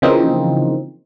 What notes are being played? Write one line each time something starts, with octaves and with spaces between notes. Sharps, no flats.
C#3 E3 F3 A#3 C4 D#4